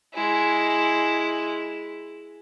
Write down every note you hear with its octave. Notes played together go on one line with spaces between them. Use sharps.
G#3 E4